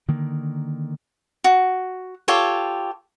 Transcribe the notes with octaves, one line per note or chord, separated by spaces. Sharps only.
D3 D#3 A#3
F#4
F4 G4 A4 C#5